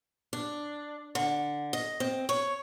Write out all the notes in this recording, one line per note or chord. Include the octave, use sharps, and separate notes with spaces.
D4
D3
D#5
C4
C#5